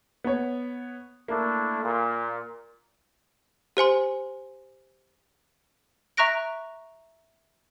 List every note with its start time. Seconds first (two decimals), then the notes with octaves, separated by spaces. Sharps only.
0.24 B3 C#5
1.28 A3 A#3 D4 E4
1.82 A#2
3.77 G4 C5 G#5 C6
6.17 E5 A#5 C#6 F#6 A#6 D7